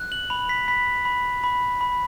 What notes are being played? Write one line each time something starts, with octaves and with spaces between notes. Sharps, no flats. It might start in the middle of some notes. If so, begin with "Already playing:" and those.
Already playing: F#6
F#7
B5 F7
B6
B5 B6
B5
B5
B5